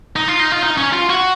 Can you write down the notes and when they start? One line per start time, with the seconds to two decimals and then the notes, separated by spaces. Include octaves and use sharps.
0.16 D#4
0.28 F4
0.39 D#4
0.52 F4
0.63 D#4
0.78 C#4
0.93 F4
1.10 F#4